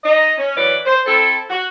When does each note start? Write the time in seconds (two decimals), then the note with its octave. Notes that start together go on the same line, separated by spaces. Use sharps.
0.04 D#4 D#5
0.38 C#4
0.56 E3 F#3 C#4 B4 D5
0.86 C5
1.06 C4 E4 A4
1.50 F#4